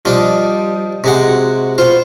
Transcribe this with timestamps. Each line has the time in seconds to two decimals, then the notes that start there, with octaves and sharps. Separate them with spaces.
0.05 F3 G3 D4 D#5
1.04 C3 G#3 C4 F#5
1.28 F#4
1.78 B3 F4 F#4 C5